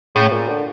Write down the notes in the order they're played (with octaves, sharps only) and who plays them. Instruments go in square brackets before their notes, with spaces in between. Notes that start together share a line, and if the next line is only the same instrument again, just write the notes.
[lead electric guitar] A2 [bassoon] C#3
[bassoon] A#2
D3